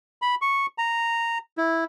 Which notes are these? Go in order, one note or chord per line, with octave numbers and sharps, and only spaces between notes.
B5
C#6
A#5
E4